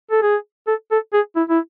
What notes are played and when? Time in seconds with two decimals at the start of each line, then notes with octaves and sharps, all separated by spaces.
0.11 A4
0.22 G#4
0.67 A4
0.91 A4
1.13 G#4
1.36 E4
1.50 E4